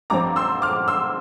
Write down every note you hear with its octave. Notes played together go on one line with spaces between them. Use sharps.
A1 G2 F3 C4 A#5 D6
C6 E6
D6 F6
C6 E6